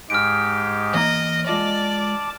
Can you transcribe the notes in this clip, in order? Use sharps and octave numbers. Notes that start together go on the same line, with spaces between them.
G#2 G#3 G4 F6 D7
E3 A#3 D#5 A#5
G#3 F4 D5 D#5 A5 D6